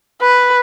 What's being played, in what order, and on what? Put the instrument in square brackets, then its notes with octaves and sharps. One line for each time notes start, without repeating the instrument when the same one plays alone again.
[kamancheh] B4